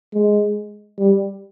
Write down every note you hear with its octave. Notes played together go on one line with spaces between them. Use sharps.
G#3
G3